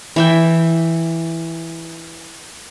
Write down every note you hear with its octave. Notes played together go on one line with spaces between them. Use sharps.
E3 E5 G5